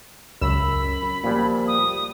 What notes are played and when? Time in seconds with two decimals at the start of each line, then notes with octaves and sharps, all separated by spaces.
0.41 C#2 F#2 B5 E6
1.24 A#2 F3 G3
1.67 D#6